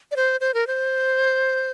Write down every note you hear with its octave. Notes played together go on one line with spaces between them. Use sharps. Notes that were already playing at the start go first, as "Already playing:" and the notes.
D5
C5
C5
A#4
C5